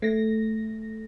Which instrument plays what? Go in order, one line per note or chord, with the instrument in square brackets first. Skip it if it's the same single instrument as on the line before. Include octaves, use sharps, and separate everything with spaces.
[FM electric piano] A3 A#6